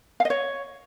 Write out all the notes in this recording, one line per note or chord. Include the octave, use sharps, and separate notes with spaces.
F5
D#5
C#5